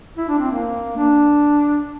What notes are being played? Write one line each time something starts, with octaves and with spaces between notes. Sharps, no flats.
E4
D4
C4
A#3
D4